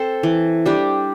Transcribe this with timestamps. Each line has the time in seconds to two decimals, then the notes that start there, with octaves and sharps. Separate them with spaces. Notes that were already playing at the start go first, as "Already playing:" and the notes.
Already playing: C4 A4 C5
0.23 E3
0.66 G3 D4 G4